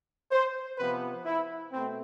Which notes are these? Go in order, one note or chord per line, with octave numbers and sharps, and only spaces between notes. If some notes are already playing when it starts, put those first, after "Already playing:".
C5
C3 F3 B3 B4
E4
B2 A3 C4